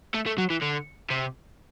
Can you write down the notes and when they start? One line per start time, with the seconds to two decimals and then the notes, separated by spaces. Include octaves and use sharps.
0.14 A3
0.26 A3
0.38 F#3
0.50 E3
0.62 D3
1.10 C3